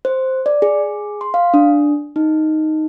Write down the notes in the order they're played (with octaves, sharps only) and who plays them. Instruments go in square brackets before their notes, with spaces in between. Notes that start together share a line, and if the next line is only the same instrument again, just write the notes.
[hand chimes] C5
D5
G#4
C6
F5
D4
D#4